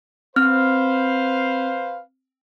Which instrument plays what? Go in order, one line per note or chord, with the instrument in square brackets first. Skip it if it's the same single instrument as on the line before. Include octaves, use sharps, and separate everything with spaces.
[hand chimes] C4 F6 [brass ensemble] B4 C5 F5